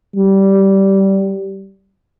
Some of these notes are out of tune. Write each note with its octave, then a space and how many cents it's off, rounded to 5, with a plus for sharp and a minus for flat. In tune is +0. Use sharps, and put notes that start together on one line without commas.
G3 -15